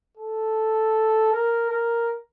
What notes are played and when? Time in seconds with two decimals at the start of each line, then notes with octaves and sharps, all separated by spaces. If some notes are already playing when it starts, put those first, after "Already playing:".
0.17 A4
1.33 A#4
1.70 A#4